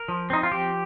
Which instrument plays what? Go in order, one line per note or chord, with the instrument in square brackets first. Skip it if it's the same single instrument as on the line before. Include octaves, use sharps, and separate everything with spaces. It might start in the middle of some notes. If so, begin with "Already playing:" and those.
Already playing: [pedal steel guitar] A#4
F3
C4 D#4
F4
F3 G4